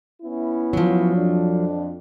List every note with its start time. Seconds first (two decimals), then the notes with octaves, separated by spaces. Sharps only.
0.22 B3 C#4 E4
0.73 F3 F#3
1.15 F2 D4